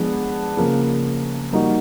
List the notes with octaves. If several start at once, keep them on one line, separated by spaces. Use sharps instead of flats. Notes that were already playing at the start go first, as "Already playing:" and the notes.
Already playing: F3 G#3 B3 D4
C#3 F3 A#3
G3 A#3 D#4 F#4